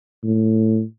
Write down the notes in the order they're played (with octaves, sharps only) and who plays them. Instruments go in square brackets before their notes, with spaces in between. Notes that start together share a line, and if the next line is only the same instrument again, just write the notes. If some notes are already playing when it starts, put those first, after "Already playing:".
[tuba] A2